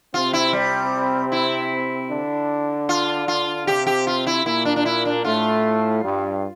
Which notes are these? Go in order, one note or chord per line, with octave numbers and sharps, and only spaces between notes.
C3 C4 F4
E4
G3
E4
D3 D4
F4
F4
C3 C4 G4
G4
F4
E4
A#2 A#3 E4
D4
D4
E4
D4
A2 A3 F4
G2 G3